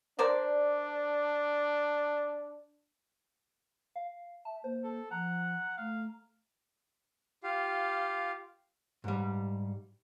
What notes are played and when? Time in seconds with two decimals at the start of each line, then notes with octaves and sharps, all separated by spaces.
0.19 D4 A#4 C5 D5
3.96 F5
4.45 E5 A5
4.64 A#3 C5
4.84 A4
5.11 F3 F#5 A#5
5.77 A3 F5
7.43 F4 G4 F5
9.04 G#2 G3